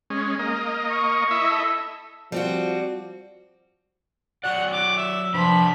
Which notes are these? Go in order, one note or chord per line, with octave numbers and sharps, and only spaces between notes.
G#3 C#4
A#3 D#5
C#6
E4 D#5 E5
A4
F3 G3 C4 F#4
F#3 F#4 D5 F#5
D6
E5
C3 F3 D4 B4 B5